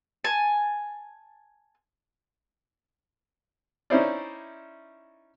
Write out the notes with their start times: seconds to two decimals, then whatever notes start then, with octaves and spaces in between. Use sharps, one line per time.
0.24 G#5 A5
3.90 C#4 D#4 E4 C5 D5